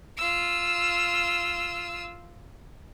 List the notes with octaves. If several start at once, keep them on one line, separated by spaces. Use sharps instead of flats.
F4 E6